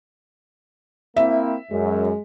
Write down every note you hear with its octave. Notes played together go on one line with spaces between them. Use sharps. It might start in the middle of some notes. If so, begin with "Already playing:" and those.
A#3 C4 E4 E5
F#2 G#3